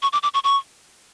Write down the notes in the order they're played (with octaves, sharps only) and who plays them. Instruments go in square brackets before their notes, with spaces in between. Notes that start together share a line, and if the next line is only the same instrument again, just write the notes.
[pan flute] C#6
D6
D6
C#6
C#6